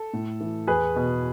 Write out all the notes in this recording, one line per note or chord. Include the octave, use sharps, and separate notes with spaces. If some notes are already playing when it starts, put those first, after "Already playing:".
Already playing: A4
A2
E3
E2 G#4 B4
B2